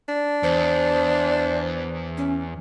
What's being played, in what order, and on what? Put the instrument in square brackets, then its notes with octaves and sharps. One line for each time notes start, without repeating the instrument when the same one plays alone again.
[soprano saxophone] D4
[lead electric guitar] E2 [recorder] C5
[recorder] C#4